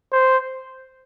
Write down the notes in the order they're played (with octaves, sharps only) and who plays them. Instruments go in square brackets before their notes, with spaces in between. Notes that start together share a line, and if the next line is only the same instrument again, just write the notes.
[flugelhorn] C5